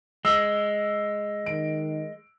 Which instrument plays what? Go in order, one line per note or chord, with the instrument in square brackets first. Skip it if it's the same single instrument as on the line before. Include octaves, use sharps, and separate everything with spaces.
[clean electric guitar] G#3 [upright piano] E6
[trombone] D#3 [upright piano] D7